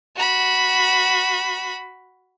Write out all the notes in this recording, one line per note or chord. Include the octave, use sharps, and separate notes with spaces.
F#4 B5